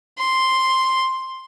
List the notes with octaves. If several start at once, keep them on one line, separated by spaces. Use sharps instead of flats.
C6